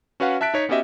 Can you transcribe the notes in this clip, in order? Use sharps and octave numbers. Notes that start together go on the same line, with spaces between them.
C#4 F#4 B4 F5 F#5
E5 A5 F#6 B6 D7
D#4 C#5 B6 C#7
B3 C#4 F#4 G4 D#5 E5